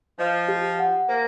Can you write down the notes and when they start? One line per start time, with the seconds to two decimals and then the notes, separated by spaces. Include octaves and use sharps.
0.19 F3 D#5
0.49 G4
0.79 F#5
1.08 A#3 C5